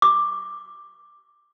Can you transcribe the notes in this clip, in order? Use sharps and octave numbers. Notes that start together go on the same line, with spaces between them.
D6